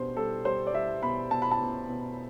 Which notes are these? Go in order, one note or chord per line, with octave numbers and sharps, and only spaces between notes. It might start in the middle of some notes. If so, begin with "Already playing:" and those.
Already playing: B2 G3 D4 C5
G3 A4
G3 C5
D5
G3 E5
B2 B5
B2 A5
B5
A5
B2
B2